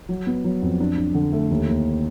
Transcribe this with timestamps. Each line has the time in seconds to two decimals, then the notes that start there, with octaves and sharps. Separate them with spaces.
0.09 F#3
0.27 B3
0.44 F#3
0.62 F2
0.80 D4
0.98 D4
1.15 D3
1.32 A3
1.50 D#2
1.68 D#2